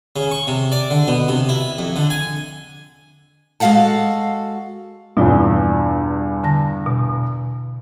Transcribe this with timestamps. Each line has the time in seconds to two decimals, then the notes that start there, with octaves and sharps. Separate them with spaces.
0.16 C#3
0.31 C#6
0.47 C3
0.72 D5
0.90 D3
1.08 B2
1.28 C3
1.49 E4
1.79 F2
1.96 D3
2.10 G#5
3.60 G#3 F#4 A4 F5 F#5 A5
5.17 E2 G2 B2 F4
6.43 D3 A5 A#6
6.86 B2